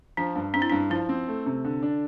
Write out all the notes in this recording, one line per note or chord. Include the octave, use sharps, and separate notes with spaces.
F3 D4
G2
C4 D4
E4
G2 D4
F3 E4
C4
A3
C3
D3
D4